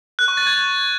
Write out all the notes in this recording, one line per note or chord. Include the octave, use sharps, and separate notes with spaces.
F#6
C#6
A6
G#6